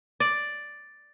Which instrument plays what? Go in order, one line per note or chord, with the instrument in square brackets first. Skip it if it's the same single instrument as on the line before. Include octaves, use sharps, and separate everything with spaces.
[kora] D5